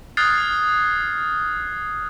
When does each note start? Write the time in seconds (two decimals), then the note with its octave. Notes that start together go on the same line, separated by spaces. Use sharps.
0.17 D#6 F6 F#6 G#6 A6 C7